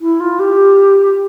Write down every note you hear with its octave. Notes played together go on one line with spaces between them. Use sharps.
E4
F4
G4